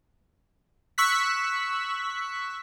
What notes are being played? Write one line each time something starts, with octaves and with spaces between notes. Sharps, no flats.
C#6 E6 F#6 B6